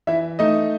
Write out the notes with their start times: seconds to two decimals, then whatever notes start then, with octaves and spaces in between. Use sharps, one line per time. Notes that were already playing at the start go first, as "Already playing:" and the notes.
0.07 E3 E4 E5
0.39 A3 D#4 D#5